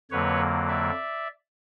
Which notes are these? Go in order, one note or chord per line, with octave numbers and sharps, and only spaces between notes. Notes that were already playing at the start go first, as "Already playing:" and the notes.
F2 D3 F#3 A#3 B4 C#5
D5 E5